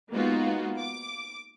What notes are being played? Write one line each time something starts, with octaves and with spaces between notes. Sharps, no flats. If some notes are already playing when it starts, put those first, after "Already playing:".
G#3 A#3 B3 D#4 F4 F#4
D6